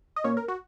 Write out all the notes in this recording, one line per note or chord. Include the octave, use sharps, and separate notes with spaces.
D#5
A#2 A#3 C#4 C#5
A#4
F#4